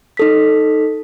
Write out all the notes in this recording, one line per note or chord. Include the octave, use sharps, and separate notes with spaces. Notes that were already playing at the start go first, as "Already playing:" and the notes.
D#4 A4 B6